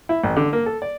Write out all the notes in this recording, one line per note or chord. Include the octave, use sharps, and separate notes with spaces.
E4
A1
D3
A#3
A4
D5